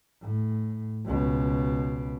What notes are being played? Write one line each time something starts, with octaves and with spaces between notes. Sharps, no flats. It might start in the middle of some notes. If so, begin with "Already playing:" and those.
A2
C#2 B2